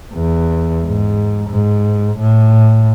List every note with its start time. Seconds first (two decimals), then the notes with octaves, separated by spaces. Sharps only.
0.14 E2
0.86 G#2
1.49 G#2
2.19 A2